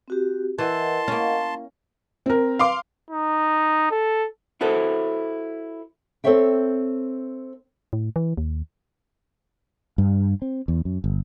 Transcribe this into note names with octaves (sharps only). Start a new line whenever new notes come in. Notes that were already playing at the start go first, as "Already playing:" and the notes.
C4 F#4 G4
E3 A#4 D#5 F#5 A5 C6
A#3 C#4
C4 A#4
F5 C6 D6
D#4
A4
E4 F#4 A4 C5
C4 A4 C5 C#5 E5 G5
A2
E3
D#2
G2
C4
E2
F#2
G1